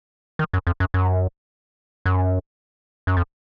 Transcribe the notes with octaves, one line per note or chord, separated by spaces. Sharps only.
D#3
F#2
F2
F#2
F#2
F#2
F#2
F2